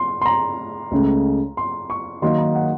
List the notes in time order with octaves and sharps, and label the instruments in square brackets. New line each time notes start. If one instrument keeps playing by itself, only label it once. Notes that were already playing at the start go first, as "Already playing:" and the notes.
Already playing: [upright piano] C6
C6
A#5
[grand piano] C#2 C#3 A3
[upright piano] C6
C#6
[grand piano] D#3 F#3 A#3 D#4 F#4 [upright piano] C6
[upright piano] A#5
F#5